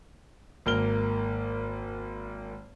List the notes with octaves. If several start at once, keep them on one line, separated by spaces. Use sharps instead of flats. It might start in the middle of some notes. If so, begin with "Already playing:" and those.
G#1 A#3 F6 G7